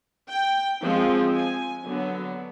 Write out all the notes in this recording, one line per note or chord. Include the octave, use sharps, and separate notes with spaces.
G5
F3 G#3 C4
G#5
D3 F#3 B3